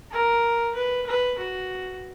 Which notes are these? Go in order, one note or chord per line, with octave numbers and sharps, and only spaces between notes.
A#4
B4
B4
F#4